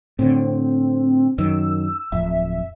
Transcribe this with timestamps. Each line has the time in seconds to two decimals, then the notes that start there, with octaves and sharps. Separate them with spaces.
0.19 A2 D3 C4
1.38 F#2 D#3 E6
2.12 D1 F2 E5